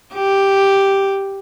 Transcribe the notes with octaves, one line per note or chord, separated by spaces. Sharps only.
G4